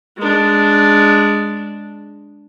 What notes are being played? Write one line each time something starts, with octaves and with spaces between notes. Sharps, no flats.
G#3 D4